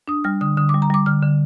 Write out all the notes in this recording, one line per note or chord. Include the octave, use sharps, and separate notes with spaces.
D4 D#6
G3 F6
D3 D#6
D3 D#6
D6
G3
A#5
G3 D6
D3 F6
D3